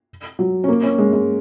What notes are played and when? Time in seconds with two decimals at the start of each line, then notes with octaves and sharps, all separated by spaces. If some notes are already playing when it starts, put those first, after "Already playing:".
0.39 F#3
0.64 C#4
0.68 A#3
0.83 C#4
0.98 G#3
1.13 G#3